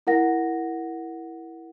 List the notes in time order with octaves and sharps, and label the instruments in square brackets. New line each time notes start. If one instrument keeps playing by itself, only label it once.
[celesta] E4 A#4 F#5 A#6